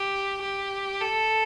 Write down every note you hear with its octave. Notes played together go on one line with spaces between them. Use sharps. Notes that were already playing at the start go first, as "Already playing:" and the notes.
Already playing: G4
G4
A4